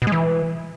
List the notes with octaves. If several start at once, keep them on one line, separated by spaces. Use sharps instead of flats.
B2
G#3
E3